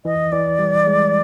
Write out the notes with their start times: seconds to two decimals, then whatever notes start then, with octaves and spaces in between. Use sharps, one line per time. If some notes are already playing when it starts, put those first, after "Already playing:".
0.05 E3 D#5
0.32 E3 D5
0.59 G3
0.87 G#3